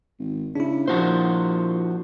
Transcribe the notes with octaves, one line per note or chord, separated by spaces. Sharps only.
G#1
C#3 D4 E4
A#2 F3 F#4 C5